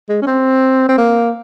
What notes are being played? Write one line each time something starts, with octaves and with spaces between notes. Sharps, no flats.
G#3
C#4
C4
C4
A#3